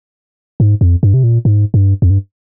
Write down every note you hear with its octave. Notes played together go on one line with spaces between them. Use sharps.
G#2
F2
G2
C3
A#2
G#2
G2
F2
G2